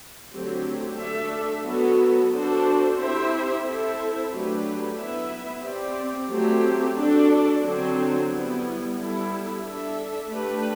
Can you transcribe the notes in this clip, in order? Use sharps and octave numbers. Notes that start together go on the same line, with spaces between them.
D3 F#3 A3 C4 G4
A3 D4 A4 E5
F#3 B3 F#4 A4
D4 F#4 A4 C5
C4 E4 G4 C5 E5
C4 E4 A4 C5 E5
F#3 A3 D4 G4 B4
B3 E4 B4 E5
C4 G4 D5
F#3 A3 C4 G4
D4 F#4 A4 D5
D3 F#3 C4
G3 B3 E4
G3 B3 E4 A4
D4 A4 E5
A3 D4 G4 B4